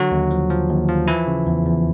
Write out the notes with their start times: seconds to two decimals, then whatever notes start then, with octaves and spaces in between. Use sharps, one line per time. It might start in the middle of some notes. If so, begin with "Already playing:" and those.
Already playing: D3 F#3 F#4
0.12 D#2
0.31 F3
0.50 F3
0.69 D#2
0.89 F3
1.08 E3 E4
1.27 C#3
1.47 E2
1.66 E2